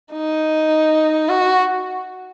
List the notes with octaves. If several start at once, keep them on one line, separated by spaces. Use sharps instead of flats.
D#4
F#4